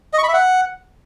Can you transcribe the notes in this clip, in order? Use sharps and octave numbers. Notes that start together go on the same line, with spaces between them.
D#5
C#6
B5
E5
F#5